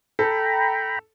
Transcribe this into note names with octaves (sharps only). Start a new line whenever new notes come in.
A4 G5 A#5 B5